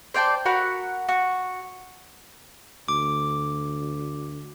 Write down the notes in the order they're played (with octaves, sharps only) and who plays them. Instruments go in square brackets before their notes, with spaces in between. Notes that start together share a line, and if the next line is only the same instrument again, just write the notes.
[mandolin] C5 D5 G5 A5
F#4 A#4 F#5 B5
F#4
[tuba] D2 [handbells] D6